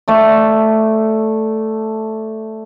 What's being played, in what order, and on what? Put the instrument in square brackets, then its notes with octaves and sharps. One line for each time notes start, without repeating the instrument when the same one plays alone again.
[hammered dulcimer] A3 D5